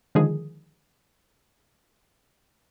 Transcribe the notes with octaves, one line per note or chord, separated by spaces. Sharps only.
D3 D#3 F3 G#3 G#4